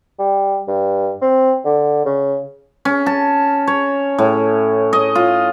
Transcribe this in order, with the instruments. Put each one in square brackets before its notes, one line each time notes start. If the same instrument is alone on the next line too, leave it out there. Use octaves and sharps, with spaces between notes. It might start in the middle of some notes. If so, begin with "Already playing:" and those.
[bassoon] G3
G2
C4
D3
C#3
[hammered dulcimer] C#4
A5
C#5
A2
D#5
F4